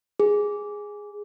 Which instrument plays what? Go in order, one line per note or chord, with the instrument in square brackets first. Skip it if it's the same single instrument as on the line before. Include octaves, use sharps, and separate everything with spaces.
[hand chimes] G#4